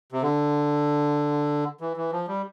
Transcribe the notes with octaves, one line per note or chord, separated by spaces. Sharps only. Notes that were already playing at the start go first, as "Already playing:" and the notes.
C3
D3
E3
E3
F3
G3